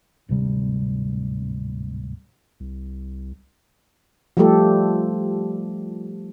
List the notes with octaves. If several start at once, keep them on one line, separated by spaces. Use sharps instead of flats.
D1 G#1 C3 G3
C2
F3 G3 A3 G4 A4